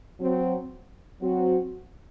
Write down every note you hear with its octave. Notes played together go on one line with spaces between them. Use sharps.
F#3 C4 F#4
F#3 C4 F#4